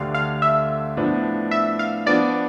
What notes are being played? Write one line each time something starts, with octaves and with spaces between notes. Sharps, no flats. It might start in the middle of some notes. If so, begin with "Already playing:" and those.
Already playing: D2 D3 A3 D4 G4 F5
F5
E5
A2 F3 B3 D4
E5
F5
F3 B3 D4 D5